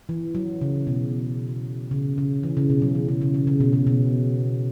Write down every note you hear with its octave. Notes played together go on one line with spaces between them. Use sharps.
E3
F#3
C#3
B2
C#3
C#3
E3
C#3
B2
F#3
E3
C#3
C#3
C#3
C#3
B2
C#3
B2